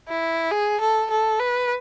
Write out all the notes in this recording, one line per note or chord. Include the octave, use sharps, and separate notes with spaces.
E4
G#4
A4
A4
B4